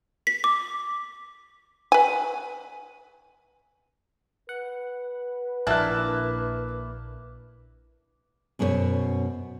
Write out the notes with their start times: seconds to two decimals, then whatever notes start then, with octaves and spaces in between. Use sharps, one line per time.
0.27 B6
0.44 D6
1.92 B4 G#5
4.49 B4 F#5
5.67 A#1 A#3 D4 E4 E5 A5 F#6
8.59 F#2 B2 C#4 G#4 C5 C#5